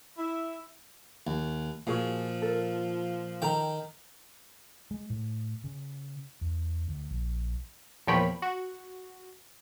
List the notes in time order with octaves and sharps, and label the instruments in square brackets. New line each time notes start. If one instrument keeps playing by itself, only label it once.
[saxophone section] E4
[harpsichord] D#2
[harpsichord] A#2 [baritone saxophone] F3 [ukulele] F#4 G#4 F5
[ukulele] A4 A#4
[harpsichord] D#3 G5 [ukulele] A4 A#5
[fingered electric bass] G#3
A2
C#3
E2
D2
A#1
[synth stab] E2 A#2 F3 C#5 G5 B5
F#4